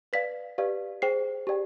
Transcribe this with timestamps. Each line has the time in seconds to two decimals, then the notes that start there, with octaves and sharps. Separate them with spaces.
0.13 B4 D5 F5 B6
0.58 G4 B4 D5 F5
1.02 G#4 C5 G5 C7
1.47 G4 D5 G5